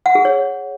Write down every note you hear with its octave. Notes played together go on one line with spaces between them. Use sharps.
F#5
G#4
C#5